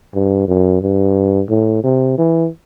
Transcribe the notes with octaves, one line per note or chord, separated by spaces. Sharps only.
G2
F#2
G2
A2
C3
E3